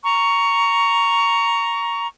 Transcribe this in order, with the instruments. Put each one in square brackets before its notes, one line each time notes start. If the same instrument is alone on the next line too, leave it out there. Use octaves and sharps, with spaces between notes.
[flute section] A#5 C#6